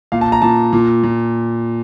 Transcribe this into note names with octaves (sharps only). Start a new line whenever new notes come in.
A#2 F5
A5
A#5
A#2 A5
A#2
A#2